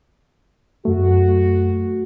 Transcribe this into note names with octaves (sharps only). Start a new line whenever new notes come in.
F#2 A3 F#4